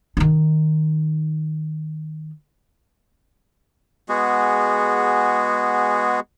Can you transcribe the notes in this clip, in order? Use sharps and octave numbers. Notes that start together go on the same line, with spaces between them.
D#3 D#4
G#3 B3 F#4 G#4